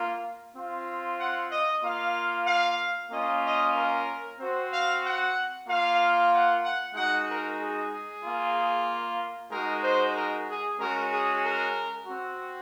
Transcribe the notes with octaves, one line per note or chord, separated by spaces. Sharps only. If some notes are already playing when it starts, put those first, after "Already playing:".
Already playing: A#3 F4
C4 F4
F#5
D#5
A#3 F4 F5
F5
A#3 C#4 F4 D#5
D#5
A#4
C4 F#4 C5
F5
F#5
A#3 F4 F5
F#5
F#5
G#3 D#4 F#4 F#5
A#4
G#4
A#3 F4
G#3 D#4 F#4 A#4
C5
A#4
G#4
G#3 C#4 F#4 A#4
G#4
A#4
C4 F#4